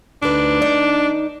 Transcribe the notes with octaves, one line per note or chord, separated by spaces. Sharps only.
D2 D4 D#4 B4
D#4 D5